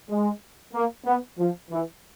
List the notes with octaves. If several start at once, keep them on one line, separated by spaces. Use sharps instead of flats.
G#3
A#3
B3
F3
E3